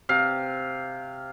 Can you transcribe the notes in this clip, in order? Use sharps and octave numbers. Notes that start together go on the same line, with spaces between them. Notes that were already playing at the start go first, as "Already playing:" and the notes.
C3 F5